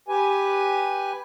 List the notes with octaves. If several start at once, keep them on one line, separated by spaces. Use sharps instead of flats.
G4 B4 G#5